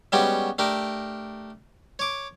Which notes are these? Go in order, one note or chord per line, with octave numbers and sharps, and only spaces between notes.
G3 G#3 B3 C#4 F#4 G4
A3 D4 G4 A#4
C#5 D6